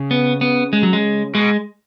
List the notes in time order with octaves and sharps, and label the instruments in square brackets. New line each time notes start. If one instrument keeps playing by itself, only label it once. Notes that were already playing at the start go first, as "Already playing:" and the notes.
Already playing: [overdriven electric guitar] C#3
[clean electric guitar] B3
B3
G#3
F#3
G#3
[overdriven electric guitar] B2 [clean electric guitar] G#3